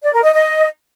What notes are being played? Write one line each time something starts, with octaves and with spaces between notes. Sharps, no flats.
D5
A#4
D#5
D#5